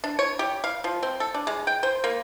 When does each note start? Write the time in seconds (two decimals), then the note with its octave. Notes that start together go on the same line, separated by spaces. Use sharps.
0.04 D4
0.19 C#5
0.39 G4
0.64 F5
0.84 F3
1.03 C4
1.20 A4
1.34 D4
1.47 G#3
1.67 G5
1.83 C5
2.04 A#3